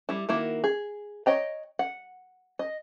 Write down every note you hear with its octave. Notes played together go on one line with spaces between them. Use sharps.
G3 E4
D#3 A#3 E4 F#4
G#4
C#5 D#5 G5 A#5
F#5
D#5